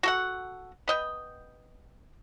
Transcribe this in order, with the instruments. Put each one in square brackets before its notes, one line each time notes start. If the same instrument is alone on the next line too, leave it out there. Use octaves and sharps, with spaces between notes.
[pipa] F#4 A4 F#5
B3 D#5 G5